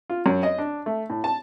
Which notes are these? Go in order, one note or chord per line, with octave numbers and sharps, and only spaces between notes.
F4
F#2
D#5
D4
A3
A2
A5